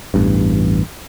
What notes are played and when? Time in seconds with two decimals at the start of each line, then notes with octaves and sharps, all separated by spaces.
0.14 A1 E2 G2